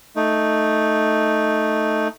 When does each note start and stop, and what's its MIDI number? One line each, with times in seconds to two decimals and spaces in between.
0.16 2.08 57
0.16 2.08 63